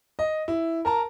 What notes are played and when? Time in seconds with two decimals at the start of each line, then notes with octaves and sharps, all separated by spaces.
0.19 D#5
0.48 E4
0.85 A#4 A5 A#5